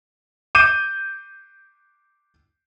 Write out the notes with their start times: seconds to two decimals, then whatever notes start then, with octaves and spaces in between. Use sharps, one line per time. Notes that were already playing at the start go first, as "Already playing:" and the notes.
0.55 D6 G6 D#7